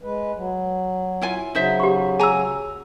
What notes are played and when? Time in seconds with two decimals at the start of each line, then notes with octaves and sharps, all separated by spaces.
0.03 G#3 B4
0.36 F#3
1.21 E4 F4 G#5
1.55 C#3 F#3 D#4 C5 E5
1.80 G4 C#6
2.19 G#4 G#5 A#5 E6